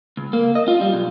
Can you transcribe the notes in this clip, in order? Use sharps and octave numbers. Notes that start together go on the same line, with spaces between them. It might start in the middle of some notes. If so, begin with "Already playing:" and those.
C#2
A#3
D#5
F4
G3
B1